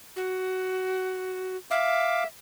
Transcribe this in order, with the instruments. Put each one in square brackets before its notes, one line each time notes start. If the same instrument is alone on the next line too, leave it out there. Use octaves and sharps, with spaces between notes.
[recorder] F#4
[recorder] E5 [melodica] F5 D6